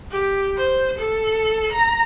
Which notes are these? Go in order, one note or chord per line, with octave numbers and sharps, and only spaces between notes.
G4
C5
A4
A#5